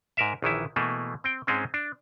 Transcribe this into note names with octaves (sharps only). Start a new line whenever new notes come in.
G#2 A#4 E5
A#1 D#3 E3 E4
B2 E3 A3 A#3
C4 G5
G#2 G#3 C4 C#4
D4